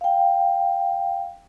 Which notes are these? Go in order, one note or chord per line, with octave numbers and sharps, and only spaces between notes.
F5 G5